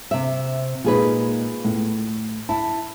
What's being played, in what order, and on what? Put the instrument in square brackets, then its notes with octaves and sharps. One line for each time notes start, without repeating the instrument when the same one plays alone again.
[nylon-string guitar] C3 E5
[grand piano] A#2 G#3 D#4 [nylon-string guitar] F4 G#4 B4
[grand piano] A2
[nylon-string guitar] E4 [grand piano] A5